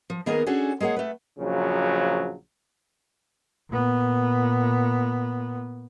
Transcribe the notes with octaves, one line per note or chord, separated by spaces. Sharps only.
F3
D#3 A#3 B3 G#4 A#4 D#5
C#4 D4 F#4 G#4 A4
G#3 A#3 G#4 C#5 F#5
A3 B4
A#1 C#3 F3 F#3
A#2 B3